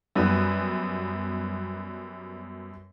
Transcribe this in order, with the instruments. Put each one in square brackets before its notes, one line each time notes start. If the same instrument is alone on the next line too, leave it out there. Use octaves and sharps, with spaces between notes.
[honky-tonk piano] F#2 G3 B3 B4